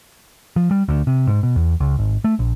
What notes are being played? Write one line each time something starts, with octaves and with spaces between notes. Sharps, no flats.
F3
G3
D2
C3
G#2
B2
E2
C#2
G#1
A3
A#1